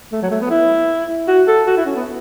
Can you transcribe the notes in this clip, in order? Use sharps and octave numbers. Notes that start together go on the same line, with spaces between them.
A3
F#3
A3
B3
E4
F#4
A4
F#4
E4
C#4
B3